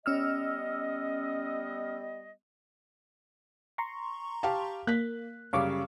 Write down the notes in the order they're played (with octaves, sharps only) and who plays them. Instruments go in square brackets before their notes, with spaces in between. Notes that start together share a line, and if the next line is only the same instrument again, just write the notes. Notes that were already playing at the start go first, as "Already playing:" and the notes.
[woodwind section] G3 B3 D#5 [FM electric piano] C#4 E6 F6
[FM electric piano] A#5 C6 C#6
[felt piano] G4 F5 A5
[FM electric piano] A#3 [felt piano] F#6 B6
[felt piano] F#2 C#3 G3 [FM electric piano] F5 C#6 D6